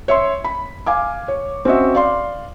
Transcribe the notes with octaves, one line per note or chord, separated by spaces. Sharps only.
C#5 E5 C6
B5
F5 G#5 D6
C#5
C4 C#4 F#4 D#5 E5
D5 F5 C6